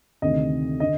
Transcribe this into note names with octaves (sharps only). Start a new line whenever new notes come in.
D2 C3 D#3 D#5
D3 D#5